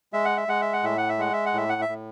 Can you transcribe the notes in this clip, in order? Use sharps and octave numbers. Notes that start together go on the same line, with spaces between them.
G#3 E5
F#5
E5
G#3 F#5
E5
F#5
A2 E5
F#5
E5
G#3 F#5
E5
F#5
A2 E5
F#5
E5
A2